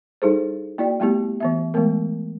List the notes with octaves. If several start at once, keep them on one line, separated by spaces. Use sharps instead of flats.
G3 D#4 E4 G#4 A4 C5
A#3 E4 F#4 D5 G5
G3 A3 B3 E4 G4
E3 B3 E5
E3 G#3 A3 B3 A#4